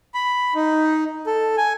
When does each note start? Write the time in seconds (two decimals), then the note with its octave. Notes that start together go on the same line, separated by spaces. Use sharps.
0.14 B5
0.55 D#4
1.27 A4
1.57 G#5